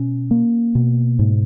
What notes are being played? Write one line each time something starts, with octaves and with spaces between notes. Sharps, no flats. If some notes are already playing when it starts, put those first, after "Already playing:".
Already playing: B2 C#4
A#3
B2
G#2